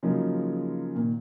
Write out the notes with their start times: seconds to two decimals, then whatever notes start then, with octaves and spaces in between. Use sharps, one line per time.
0.03 C#3 F3 F#3 G#3 A#3 D#4
0.96 A#2 D#3